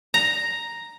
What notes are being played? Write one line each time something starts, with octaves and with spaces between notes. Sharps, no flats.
A#5